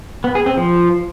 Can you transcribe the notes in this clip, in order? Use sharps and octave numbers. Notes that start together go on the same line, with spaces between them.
B3
G#4
C4
F3